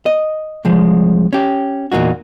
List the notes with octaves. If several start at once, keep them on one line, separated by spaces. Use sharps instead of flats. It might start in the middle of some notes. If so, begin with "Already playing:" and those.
D#5
C2 F3 G#3
C#4 G4
E2 A#2 A#3 D#4 F#4